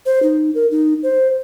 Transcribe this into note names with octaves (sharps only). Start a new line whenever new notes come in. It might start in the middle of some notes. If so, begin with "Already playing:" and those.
C5
D#4
A#4
D#4
C5